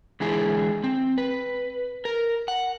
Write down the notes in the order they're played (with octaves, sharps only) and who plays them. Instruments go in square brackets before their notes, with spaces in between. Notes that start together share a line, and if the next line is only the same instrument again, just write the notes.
[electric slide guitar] D3 E3 G#3 E4 G#4
C4
B4
A#4
F#5